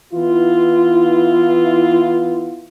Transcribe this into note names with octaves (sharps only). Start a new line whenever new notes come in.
E3 B3 E4 F4